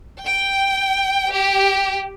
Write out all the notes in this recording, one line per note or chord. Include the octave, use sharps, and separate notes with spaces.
G5
G4